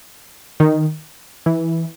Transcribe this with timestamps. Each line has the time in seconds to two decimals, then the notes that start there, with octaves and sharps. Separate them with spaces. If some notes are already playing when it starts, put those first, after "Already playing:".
0.60 D#3
1.46 E3